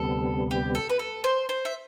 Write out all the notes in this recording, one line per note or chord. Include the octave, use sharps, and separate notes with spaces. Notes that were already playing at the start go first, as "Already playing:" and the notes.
Already playing: D2 C3 G3 B3 A4
G4
A4
B4
A4
C5
C5
E5